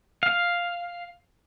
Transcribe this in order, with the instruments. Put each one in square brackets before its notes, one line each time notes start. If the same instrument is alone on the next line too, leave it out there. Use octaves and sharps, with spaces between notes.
[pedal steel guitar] F5